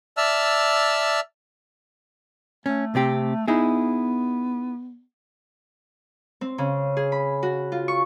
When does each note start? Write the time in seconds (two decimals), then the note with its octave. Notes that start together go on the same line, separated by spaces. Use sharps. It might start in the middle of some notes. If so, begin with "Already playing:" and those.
0.17 D5 E5 A5 E6 F6
2.66 A3 C#4
2.95 C3 C4 G4
3.48 B3 D#4 E4 G#4
6.41 C4
6.58 C#3
6.97 G#4
7.12 B5
7.43 F#4
7.72 F4
7.88 C#6